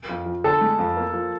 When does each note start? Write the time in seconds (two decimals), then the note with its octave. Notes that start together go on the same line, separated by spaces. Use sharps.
0.09 F2
0.26 F3
0.44 D3 A4
0.61 G#3
0.79 F2
0.97 A#3
1.13 F3